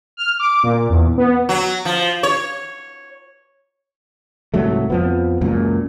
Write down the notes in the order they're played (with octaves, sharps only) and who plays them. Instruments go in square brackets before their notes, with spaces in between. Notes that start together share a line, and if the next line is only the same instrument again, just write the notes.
[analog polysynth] F6
D6
A#2
E2
B3
[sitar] F#3
F3
C#5
[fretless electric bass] C2 G#2 F#3 A3
F2 F3 B3
C#2 F#2 A#2